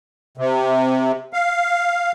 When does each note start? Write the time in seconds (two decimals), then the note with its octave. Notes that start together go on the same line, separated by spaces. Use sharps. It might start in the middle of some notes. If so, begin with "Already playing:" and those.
0.38 C3
1.33 F5